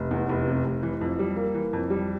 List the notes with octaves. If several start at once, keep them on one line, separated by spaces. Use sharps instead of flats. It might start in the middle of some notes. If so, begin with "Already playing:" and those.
Already playing: F1
E2
F1
C3
F1
E3
F2
G3
A#3
E3
F2
G3